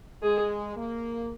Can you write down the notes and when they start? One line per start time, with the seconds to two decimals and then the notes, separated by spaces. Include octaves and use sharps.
0.23 G#3 G#4
0.77 A#3